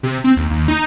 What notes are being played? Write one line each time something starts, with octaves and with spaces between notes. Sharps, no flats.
C3
C4
D#2
D#2
D#4